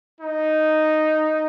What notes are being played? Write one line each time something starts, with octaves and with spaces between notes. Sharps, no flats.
D#4